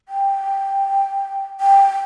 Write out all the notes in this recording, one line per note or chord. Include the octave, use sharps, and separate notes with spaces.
G5
G5